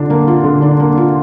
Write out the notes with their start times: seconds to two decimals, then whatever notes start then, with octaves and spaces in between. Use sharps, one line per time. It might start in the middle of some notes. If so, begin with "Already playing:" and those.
Already playing: D3 D4 F4
0.10 A#3
0.27 F4
0.44 D3
0.62 D4
0.79 A#3
0.97 F4